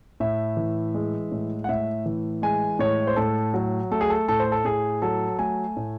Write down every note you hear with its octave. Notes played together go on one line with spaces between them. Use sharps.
A2 E5
E3
G#3
A2
F#5
A2 E5
E3
G#3 G#5
A2 C#5
C5
A2 A4
F#3
A3 A4
G#4
A4
A2 A4
C5
A4
A2 G#4
F#3 A4
A3 G#5
A2